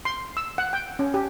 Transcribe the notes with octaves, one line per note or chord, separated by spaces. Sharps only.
C6
E6
F#5
G5
C#4
G4